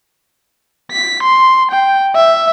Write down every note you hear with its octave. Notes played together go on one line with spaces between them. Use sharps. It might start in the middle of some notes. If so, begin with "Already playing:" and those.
B6
C6
G5
E5